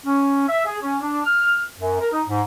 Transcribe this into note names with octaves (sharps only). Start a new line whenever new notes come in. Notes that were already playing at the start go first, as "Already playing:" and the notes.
C#4
E5
G#4
C#4
D4
F6
F#2
A#4
D#4
G#2